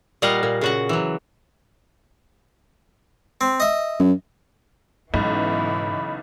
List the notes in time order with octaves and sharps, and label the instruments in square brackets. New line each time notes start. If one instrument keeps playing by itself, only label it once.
[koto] A#2 G3 A#4 D#5 F5 F#5
A#2
C#3 F#4 F#5
E3 F#3
[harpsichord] C4
D#5 E5
[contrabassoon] F#2
[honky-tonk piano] B1 [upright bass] G#2 [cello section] C#3 E3 B3 [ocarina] B5